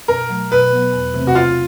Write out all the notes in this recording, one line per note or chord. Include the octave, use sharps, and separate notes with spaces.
B2 A#4
F#3 A3
B2 B4
F#3 B3
E2
C3 E3 A3 C4
F#4
C#3 F4